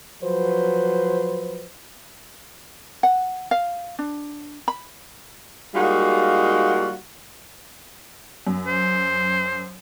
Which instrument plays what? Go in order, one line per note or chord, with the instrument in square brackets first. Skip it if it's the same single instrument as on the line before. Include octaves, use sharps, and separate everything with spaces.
[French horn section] F3 F#3 B4 C5
[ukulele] F#5
F5
D4
B5
[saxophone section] G3 G#3 A#3 D#4 F4 F#4
[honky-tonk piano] F#2
[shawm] C5